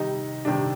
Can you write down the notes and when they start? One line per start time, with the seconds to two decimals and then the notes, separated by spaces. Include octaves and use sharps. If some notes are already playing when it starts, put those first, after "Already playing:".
Already playing: C3 D#3 G3 D#4
0.45 C3 D#3 G3 D4